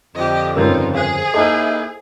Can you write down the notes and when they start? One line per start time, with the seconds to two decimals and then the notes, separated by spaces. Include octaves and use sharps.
0.15 F2 D3 G4 D#5
0.56 G2 C#3 C4 D#4 F4 A#4 C#5
0.95 G#4 C5 F5
1.34 A#3 D#4 E4 A4 C5 D#5 A5 A#5